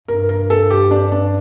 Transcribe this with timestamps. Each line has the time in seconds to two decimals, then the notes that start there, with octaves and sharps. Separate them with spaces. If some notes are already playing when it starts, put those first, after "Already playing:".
0.08 G2 A#4
0.29 A#4
0.50 A4
0.70 G4
0.91 D4
1.12 D4